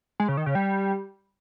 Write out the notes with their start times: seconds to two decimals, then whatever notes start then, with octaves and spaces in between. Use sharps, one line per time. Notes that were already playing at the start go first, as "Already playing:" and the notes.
0.20 G#3
0.28 C#3
0.37 D#3
0.46 C#3
0.55 G3